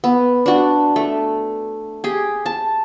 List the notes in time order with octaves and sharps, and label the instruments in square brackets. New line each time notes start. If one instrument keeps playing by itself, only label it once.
[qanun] B3
D4 F#4
A3
G4 G#4
A5